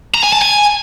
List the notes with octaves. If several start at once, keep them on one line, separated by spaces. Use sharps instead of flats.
A#5
G#5
A5
G#5